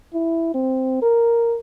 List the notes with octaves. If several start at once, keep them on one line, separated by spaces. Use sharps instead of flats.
E4
C4
A#4